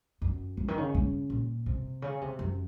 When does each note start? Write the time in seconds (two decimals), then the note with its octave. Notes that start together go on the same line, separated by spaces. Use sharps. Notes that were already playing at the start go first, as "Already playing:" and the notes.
0.22 F#2
0.57 C#3
0.68 D#3
0.78 C#3
0.95 C#3
1.30 A#2
1.66 C3
2.02 C#3
2.21 C3
2.39 F#2